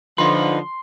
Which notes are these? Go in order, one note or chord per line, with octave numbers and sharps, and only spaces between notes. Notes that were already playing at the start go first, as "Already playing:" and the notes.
D3 F3 D#4 B4 C6